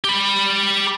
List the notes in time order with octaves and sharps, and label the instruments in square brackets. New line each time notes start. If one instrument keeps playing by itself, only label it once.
[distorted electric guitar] G4 B5